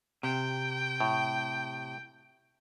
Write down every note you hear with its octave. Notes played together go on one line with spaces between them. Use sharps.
C3 G5
A2